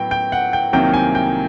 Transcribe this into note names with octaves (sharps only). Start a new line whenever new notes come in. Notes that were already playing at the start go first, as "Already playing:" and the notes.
Already playing: A2 F#3 B3 G5
G5
F#5
G5
C2 C3 D#3 F#3 A#3 G5
G#5
G5